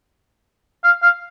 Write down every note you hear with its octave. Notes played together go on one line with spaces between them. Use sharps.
F5
F5